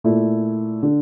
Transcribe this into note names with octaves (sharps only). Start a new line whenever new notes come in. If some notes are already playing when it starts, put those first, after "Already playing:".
A#2 A3 E4
D3